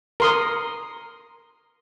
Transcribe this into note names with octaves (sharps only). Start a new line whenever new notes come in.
A#4 C6 D#6